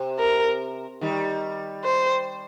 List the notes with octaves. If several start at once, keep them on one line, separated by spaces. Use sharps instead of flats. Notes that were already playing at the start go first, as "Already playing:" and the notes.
Already playing: C3
A#4
D#3 G3
C5